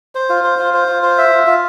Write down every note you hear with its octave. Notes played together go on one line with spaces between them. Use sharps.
C5
F4
C5
F4
C5
F4
C5
E5
F4
F4